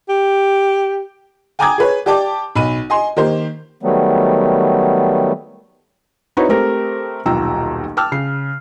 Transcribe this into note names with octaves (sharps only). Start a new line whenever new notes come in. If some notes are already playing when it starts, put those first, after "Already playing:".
G4
G5 G#5 A#5 D6 D#6 G#6
G#4 B4 C#5
G4 D5 G5 A5 D6
B1 B5 D#7
D#5 G#5 C6
D#3 A#3 G4 C5
D#3 F#3 G3 A3 B3
C4 D#4 E4 F#4 B4 C#5
A3 C4 G4 A#4
D#1 B1 F4 G5 A#5 E6
G5 A5 D6 E6 F6
C#3 C7